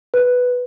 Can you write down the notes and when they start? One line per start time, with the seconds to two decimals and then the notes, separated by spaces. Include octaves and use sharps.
0.14 B4